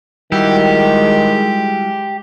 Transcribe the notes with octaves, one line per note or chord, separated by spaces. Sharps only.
D#3 G3 G#3 E4 F#4 G4